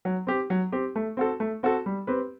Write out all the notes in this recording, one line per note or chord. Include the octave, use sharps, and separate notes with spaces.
F#3
C4 G4
F#3
C4 G4
A3
C4 F#4 A4
A3
C4 F#4 A4
G3
C4 G4 B4